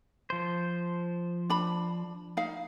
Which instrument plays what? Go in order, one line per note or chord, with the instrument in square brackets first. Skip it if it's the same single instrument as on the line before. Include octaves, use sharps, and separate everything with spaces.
[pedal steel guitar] F3 C5
[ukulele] D4 B5
D#4 F5